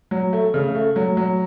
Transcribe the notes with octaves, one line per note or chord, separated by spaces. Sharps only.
F#3
A3
C#3
A3
F#3
F#3